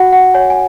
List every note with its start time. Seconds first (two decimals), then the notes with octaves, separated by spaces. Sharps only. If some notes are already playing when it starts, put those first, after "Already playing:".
Already playing: F#4 F#5
0.12 F#5
0.34 C#5 G#5
0.50 G#5